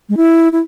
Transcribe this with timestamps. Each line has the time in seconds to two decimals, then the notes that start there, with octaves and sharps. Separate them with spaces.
0.09 G#3
0.17 E4
0.52 E4